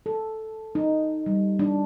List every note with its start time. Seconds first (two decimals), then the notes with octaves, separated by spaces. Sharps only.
0.06 A4
0.75 D#4
1.26 G3
1.59 D4